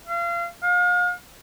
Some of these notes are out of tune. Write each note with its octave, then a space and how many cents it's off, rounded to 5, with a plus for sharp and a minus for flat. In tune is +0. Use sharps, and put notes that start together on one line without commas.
F5 -30
F5 +40